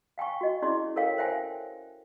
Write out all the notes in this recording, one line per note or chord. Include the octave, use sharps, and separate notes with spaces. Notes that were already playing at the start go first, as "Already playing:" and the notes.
F5 G5 G#5 C#6
F#4 D#5
C#4 E4 G#4 D5 D#5 C6
A4 A#4 C#5 F5 G5
C5 E5 G5 G#5